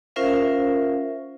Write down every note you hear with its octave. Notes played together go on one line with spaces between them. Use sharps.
C#4 F4 A#4 C5 E5 F5